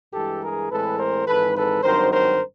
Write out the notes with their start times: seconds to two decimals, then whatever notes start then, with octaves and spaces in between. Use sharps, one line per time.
0.13 G2 E3 G#3 G4 A4
0.42 G#4 A#4
0.70 A2 E3 G#3 C4 A4 B4
0.99 A#4 C5
1.27 G#1 G#2 E3 A4 B4
1.56 A4 B4
1.83 G#1 G2 D#3 F#3 A#4 C5
2.12 A#4 C5